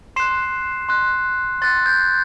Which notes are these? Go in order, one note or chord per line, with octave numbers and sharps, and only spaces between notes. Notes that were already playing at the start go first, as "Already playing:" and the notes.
C6 F#6 C7 E7
C6 F#6
C6 F#6 A6
G6